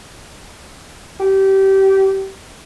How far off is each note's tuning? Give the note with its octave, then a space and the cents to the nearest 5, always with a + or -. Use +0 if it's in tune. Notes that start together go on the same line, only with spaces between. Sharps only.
G4 -20